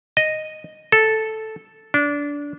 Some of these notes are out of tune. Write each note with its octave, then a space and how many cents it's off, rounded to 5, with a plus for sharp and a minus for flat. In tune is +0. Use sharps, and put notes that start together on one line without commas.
D#5 -5
A4 -5
D4 -20